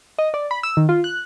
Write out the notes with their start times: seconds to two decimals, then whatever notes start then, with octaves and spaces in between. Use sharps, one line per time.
0.18 D#5
0.34 D5
0.51 B5
0.63 E6
0.77 D#3
0.89 F4
1.04 F#6